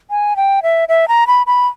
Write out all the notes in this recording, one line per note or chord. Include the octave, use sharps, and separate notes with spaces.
G#5
G5
E5
E5
A#5
B5
B5